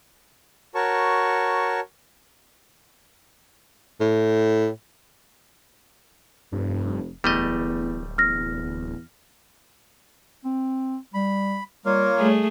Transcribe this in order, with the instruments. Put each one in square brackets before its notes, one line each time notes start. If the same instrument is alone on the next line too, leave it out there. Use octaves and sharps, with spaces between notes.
[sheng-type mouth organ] F#4 A#4 C#5 A5 C#6
[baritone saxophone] A2
[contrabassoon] F1 [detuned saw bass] G2
[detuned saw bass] D1 [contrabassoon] E2 [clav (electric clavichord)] G3 A3 D#5
[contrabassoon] E2 [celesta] F6 A#6
[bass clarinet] C4
[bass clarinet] G3 [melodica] B5
[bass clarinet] G3 [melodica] A#3 F4 A#4 [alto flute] C#5
[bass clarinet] G3 [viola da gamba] A3 G#4